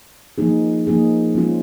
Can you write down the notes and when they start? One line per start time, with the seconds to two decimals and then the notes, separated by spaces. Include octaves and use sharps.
0.38 F3 A#3 D#4 G#4
0.87 F3 A#3 D#4 G#4
1.35 F3 G#3 C#4 F4